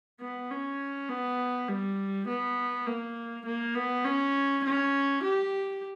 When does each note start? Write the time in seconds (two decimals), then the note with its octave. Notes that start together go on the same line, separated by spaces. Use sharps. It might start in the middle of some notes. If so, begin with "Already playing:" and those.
0.21 B3
0.50 C#4
1.09 B3
1.68 G3
2.27 B3
2.86 A#3
3.46 A#3
3.75 B3
4.05 C#4
4.64 C#4
5.23 G4